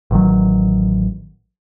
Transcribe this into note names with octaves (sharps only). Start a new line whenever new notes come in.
A1 D#3 F#3